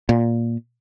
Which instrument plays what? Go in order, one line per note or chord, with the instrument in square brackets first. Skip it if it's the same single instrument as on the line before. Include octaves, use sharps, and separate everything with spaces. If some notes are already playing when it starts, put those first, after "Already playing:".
[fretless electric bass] A#2